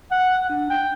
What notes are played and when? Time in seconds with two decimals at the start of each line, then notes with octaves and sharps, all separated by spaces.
0.11 F#5
0.50 D4
0.70 G5